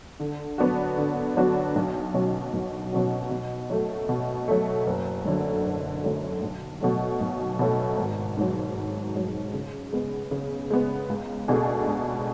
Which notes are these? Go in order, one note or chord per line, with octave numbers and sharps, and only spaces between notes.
D3
F#3 B3 D4 F#4
D3
F#3 B3 D4 F#4
B1
B2 F#3 C#4 F#4
B1
B2 F#3 C#4 F#4
B2
F#3 A3
B2
F#3 A3
F#1
F#2 D3 F#3 A3
F#1
F#2 D3 F#3 A3
B1
B2 F#3 A3
B1
B2 F#3 A3
G#1
G#2 F#3
G#1
G#2 F#3
C#3
G#3 B3
C#3
G#3 B3
C#2
B2 A3 D4 G#4
C#2